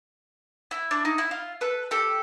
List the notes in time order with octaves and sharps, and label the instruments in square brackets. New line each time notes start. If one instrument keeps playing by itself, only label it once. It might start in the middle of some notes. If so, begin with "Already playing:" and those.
[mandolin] E4
D4
D#4
E4
F4
A4 B4
G4 A4